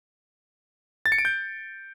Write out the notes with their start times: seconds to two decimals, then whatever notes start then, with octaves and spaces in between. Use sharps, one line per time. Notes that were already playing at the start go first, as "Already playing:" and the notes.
1.06 A6
1.12 C#7
1.18 D7
1.25 G6